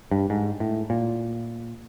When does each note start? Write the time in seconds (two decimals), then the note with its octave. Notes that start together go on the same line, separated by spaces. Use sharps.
0.11 G2
0.30 G#2
0.60 A2
0.90 A#2